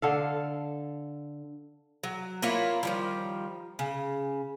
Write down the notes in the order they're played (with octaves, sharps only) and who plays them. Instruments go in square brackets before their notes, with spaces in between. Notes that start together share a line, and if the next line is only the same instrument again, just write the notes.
[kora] D3 A4 F5
[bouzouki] F#3
A#3 E4 F4 C#5
D#3 F3 G3
C#3